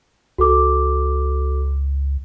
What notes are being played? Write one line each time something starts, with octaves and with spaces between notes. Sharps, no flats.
C#2 F#4 A4 D6